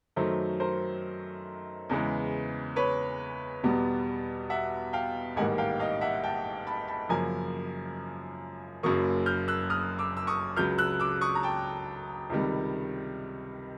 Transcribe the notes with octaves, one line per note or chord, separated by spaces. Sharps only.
F#2 D#3 F#3 A3 A#4 C5
A#4 C5
E2 C#3 E3 G#3
B4 C#5
E2 B2 G3 B3
E5 F#5
F5 G5
A1 G#2 D#3 G3 A#3 F#5 G#5
F5 G5
D#5 F5
E5 F#5
G5 A5
A5 B5
A5 B5
F#2 C#3 F3 A#3 G#5 A#5
F#1 F#2 C#3 F#3 A#3 C#6 D#6
F6 G6
E6 F#6
D#6 F6
D6 E6
E6
C#6 D#6
C#2 C#3 F#3 F6 G6
E6 F#6
D6 E6
C#6 D#6
A#5
G5 A5
C#2 C3 D#3 G3